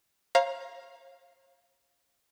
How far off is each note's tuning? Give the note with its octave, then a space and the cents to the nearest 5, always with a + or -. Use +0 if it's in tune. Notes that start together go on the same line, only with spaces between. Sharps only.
C#5 -40 F5 +0 A#5 +20